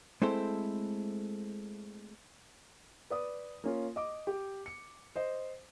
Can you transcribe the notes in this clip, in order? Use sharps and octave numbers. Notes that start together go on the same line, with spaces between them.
G#3 A3 C4 E4 A4 C5
B4 D5 D#6
A#3 C#4 F4
D#5 D6
G4
C#7
C5 D#5